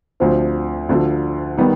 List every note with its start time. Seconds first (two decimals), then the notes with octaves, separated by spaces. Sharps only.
0.20 D2 D3 F3 C4
0.89 D2 D3 F3
1.58 D#3 G3 B3 D#4